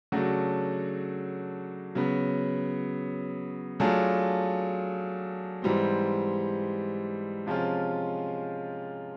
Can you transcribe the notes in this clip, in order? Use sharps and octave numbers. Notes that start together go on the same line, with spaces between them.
C#3 F#3 A3 D4 F#4
C#3 F#3 B3
F#3 A3 D4 F4 G#4
G#2 E3 G3 C4
C3 F3 G#3 C#4 F4